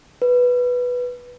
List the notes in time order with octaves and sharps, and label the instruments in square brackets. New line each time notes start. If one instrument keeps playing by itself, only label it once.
[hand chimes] B4